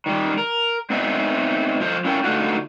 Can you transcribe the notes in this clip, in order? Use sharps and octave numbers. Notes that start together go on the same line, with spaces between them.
D#3 G3
A#4
B3 C4 D#4 G#4 D#5 E5
F3 F4 C5 D#5
C#4 E4 F4 A#4 G5
D3 A3 D#4 F4 F#4